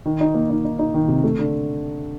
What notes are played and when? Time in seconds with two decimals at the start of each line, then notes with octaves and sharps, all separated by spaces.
0.06 D#3
0.21 D#4
0.34 A#3
0.50 D#4
0.65 D#4
0.79 D#4
0.94 D#3
1.08 C3
1.24 A3
1.39 D3